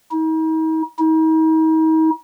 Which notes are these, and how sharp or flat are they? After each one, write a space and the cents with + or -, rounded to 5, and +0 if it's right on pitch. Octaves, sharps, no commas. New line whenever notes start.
D#4 +40
D#4 +40